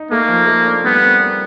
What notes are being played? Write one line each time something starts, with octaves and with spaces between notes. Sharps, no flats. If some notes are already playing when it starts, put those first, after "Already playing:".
Already playing: D#4
A3 A#3
F3
A3
D4
G3 B3
C4
A#4